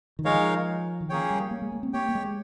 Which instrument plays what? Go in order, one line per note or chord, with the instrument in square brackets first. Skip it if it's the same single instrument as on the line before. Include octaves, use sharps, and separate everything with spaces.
[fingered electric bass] D#3
[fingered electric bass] F3 [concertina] G#3 D#4 A#4 C#5 F5
[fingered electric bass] D#3
[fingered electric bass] F3 [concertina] A#3 C#4 G#4 C#5 G5
[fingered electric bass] G3
A#3
G#3
A#3
C4
[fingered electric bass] A#3 [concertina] G4 C#5 G5
[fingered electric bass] A#3
G#3